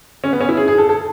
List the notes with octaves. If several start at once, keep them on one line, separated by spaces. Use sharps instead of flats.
C#4
B3
C#4
E4
G#4
G#4
A4
A4